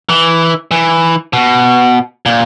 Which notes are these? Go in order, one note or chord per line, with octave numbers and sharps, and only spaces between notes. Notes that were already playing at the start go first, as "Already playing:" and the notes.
E3
E3
B2
A#2